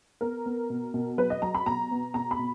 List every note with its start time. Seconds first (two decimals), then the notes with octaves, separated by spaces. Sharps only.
0.21 B3 A#4
0.46 B3
0.70 B2
0.94 B2
1.18 F#3 B4
1.30 D#5
1.42 F#3 A#5
1.55 B5
1.66 B2 A#5
1.91 B3
2.14 B2 A#5
2.31 B5
2.39 B2